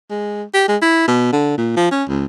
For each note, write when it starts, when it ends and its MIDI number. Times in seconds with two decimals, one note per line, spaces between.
0.11 0.43 56
0.54 0.67 67
0.69 0.77 56
0.82 1.07 64
1.08 1.30 47
1.33 1.56 50
1.58 1.74 46
1.77 1.89 53
1.91 2.04 61
2.09 2.26 37